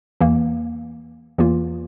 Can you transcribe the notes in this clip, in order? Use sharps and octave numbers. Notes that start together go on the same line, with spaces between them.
E2 E3 A#3
E2 E3 A#3 F4